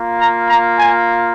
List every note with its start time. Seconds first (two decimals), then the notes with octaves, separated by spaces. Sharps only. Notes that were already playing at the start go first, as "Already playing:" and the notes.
Already playing: A#3 F4
0.20 A#5
0.49 A#5
0.77 G#5